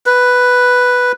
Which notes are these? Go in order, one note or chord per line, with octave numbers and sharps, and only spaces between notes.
B4